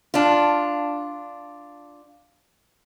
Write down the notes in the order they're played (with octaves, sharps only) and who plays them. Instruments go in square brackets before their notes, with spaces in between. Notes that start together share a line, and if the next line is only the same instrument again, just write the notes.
[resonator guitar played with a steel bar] D4 F4